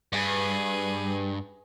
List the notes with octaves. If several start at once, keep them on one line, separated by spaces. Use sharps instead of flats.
G2 G#4 B4